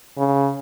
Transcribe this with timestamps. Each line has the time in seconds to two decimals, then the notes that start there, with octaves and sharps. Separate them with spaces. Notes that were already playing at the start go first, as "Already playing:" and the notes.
0.18 C#3